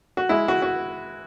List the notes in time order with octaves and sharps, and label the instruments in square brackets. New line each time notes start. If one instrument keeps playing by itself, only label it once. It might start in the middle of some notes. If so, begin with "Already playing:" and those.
[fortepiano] F#4
G#3 E4
F#4
F#4